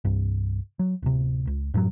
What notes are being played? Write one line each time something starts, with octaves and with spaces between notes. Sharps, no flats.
C2 G2
F#3
D1 C3
C#2
F#2 A2 E3 F#3